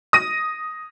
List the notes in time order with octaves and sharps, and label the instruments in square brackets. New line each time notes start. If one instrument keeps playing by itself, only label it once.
[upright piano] D#6 A#6 D#7